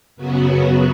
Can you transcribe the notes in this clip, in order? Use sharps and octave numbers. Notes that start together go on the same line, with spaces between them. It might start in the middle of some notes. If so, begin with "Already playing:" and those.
F#2 C#3 F#3 B3 F#4